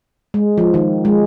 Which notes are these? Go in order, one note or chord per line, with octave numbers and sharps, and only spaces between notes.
G#3
F3
D#3
G#3